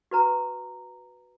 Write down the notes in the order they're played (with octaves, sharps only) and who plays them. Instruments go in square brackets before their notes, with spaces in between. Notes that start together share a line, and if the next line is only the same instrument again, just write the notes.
[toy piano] F#4 B4 A#5